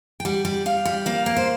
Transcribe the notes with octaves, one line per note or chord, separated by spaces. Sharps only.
G5
G3 F#5
G3
G3 F5
G3
A#3 F5
A#3
C5